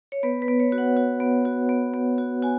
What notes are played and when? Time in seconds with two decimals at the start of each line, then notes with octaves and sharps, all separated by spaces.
0.12 C#5
0.23 B3 B4
0.42 B4
0.48 B3
0.60 C#5
0.72 F#4
0.78 F#5
0.97 F#4
1.20 B3
1.45 F#4
1.69 B3
1.94 B3
2.18 F#4
2.43 F#4 G#5